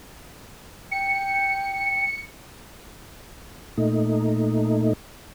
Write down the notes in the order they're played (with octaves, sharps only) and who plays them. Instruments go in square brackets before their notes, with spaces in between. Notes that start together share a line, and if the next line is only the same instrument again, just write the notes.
[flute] G5 [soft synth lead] C#7
[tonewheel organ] A#2 A3 D#4